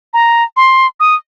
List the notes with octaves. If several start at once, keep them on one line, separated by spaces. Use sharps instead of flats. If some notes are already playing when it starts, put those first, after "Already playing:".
A#5
C6
D#6